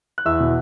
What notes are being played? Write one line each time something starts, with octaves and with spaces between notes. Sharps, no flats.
F#6
E2 E5 E6
B2